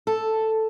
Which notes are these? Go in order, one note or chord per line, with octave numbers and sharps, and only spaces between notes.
A4